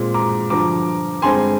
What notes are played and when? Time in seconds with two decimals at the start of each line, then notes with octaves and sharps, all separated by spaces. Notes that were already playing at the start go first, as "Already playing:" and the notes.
Already playing: A#2 G#3 C4
0.14 A#5 D6
0.50 G2 D3 F3 A#5 D6
1.22 G2 D3 G#3 C4 G#5 C6